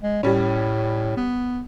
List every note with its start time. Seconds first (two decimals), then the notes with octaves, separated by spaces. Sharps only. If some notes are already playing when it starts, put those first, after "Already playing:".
0.03 G#3
0.23 A2 G3 C#4
1.17 B3